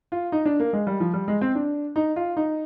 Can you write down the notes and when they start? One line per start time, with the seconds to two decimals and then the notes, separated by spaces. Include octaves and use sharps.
0.12 F4
0.32 D#4
0.46 D4
0.60 A#3
0.73 G#3
0.87 G3
1.00 F3
1.14 G3
1.28 G#3
1.41 C4
1.55 D4
1.96 D#4
2.16 F4
2.37 D#4